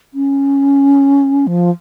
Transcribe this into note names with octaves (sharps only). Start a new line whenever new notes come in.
C#4
F3